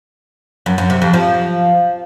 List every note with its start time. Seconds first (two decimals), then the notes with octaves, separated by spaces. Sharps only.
0.66 F#2
0.78 F#2
0.90 C3
1.02 F2
1.13 F3